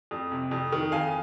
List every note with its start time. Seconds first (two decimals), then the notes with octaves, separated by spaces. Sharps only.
0.11 F2
0.31 C3
0.51 F2
0.72 D#3
0.92 F2 F5 G#5